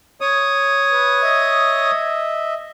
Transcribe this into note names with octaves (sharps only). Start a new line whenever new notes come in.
C#5 D#6
B4
D#5 E5